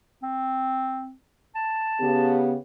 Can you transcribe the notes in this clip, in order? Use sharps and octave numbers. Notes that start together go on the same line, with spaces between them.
C4
A5
C#3 B3 G4